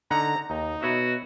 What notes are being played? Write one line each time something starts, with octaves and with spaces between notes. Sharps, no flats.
D3 D#4 F#5 A#5
D#2 D#4
B2 F#4 B4 C#5 E5